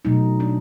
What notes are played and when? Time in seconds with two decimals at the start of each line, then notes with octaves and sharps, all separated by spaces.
0.05 B2 F#3 A3 D#4
0.40 D4